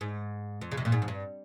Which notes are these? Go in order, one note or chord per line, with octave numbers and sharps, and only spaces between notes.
G#2
F2
C#3
C3
A#2
G#2
F2
G2